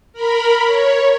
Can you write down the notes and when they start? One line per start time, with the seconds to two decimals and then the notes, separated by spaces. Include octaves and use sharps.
0.13 A#4 B5
0.64 C#5